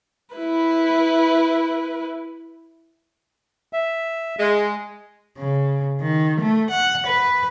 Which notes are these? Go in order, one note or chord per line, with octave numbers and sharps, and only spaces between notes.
E4 B4
E5
G#3
C#3
D#3
A3
F#5
B4